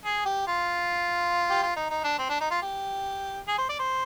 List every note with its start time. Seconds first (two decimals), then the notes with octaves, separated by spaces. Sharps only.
0.05 G#4
0.26 G4
0.47 F4
1.50 G4
1.63 F4
1.76 D#4
1.91 D#4
2.04 D4
2.19 C4
2.30 D4
2.41 D#4
2.51 F4
2.62 G4
3.48 G#4
3.58 C5
3.69 D5
3.79 C5